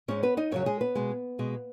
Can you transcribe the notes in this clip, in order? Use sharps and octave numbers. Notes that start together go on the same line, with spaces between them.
G#2 G#3 C#4 C#5
B3 B4
D#4 D#5
F#2 C#3 F#3 C#4 C#5
G#3 G#4
B3 B4
B2 G#3
B2 G#3